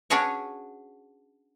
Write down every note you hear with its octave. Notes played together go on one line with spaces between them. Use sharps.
C#4 D4 F#4 G#4 B4 C#5